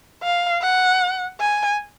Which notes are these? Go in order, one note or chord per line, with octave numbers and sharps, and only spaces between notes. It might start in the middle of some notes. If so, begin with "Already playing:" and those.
F5
F#5
G#5